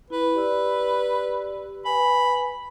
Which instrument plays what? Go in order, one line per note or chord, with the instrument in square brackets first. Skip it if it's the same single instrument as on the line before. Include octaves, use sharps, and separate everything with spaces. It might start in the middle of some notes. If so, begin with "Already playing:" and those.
[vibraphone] E4 [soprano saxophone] B4
[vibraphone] G4 D5 E6
[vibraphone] B4 G#5 [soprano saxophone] B5